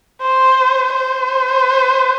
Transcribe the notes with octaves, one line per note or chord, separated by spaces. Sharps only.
C5
C5